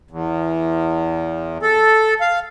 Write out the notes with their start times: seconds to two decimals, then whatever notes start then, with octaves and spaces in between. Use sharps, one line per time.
0.11 E2
1.63 A4
2.21 F5